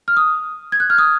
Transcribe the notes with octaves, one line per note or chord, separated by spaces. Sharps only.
F6
D#6
G#6
F#6
F6
D#6